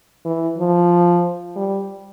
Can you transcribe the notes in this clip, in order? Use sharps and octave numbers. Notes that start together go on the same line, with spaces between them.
E3
F3
G3